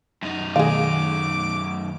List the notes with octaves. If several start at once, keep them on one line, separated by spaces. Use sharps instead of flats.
F#2 D#4
B2 D#3 A3 G#4 F5 D6